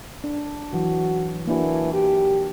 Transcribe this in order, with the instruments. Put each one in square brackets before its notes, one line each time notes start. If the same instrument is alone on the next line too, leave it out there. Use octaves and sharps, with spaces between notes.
[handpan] D4
[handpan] E3 F#3 [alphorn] F#4
[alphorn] E3 [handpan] A#3 D4 F#4
[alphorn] G4